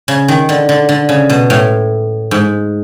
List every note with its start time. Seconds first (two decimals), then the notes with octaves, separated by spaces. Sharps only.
0.08 C#3
0.28 D#3
0.49 D3
0.69 D3
0.89 D3
1.09 C#3
1.30 B2
1.50 A2
2.31 G#2